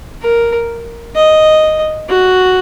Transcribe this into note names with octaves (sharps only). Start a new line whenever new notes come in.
A#4
D#5
F#4